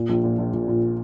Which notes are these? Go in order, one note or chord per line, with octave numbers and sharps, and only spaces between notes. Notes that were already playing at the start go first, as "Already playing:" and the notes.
Already playing: A#2
A#1
A#2
A#1
A#1
A#2